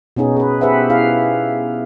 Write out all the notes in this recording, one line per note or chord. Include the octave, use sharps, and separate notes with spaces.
B2 B3 C#4 D#4 G#4
G#4 B4
G4 G#4 B4 C5 E5 F#5
E4 G#4 F5